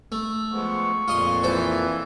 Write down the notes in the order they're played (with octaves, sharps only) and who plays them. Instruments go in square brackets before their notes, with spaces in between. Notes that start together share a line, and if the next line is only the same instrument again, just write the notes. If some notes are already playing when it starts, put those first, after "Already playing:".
[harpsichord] A3
[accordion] F3 G#3 B3 [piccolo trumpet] C#6
[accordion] F2 A#2 [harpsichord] F4 D#5 C6
[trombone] E3 [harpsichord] A4 C5